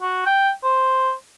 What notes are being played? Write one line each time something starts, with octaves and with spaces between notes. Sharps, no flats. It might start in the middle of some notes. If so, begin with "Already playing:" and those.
F#4
G5
C5